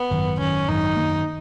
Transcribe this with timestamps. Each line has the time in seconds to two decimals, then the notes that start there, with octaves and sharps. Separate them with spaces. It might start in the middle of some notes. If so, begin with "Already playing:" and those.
Already playing: B3
0.10 G#1 F#2 D#3
0.39 G#1 F#2 D#3 C#4
0.68 G#1 F#2 D#3 D#4
0.96 F#2 D#3 A#3